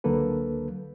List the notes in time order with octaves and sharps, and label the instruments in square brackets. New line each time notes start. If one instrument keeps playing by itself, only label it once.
[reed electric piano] C#2 D3 F#3 A#3 A4 B4